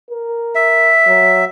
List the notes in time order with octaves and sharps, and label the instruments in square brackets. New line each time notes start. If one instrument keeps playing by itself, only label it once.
[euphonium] A#4
[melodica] E5
[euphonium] F#3